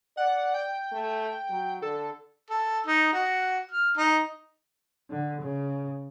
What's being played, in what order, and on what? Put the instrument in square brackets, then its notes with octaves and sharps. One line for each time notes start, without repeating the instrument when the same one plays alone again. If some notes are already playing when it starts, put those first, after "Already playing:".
[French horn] D5 [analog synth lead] F#5
[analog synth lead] G5
[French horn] A3
F#3
[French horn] D3 [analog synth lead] A4
[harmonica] A4
D#4
F#4
F6
D#4
[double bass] D3
C#3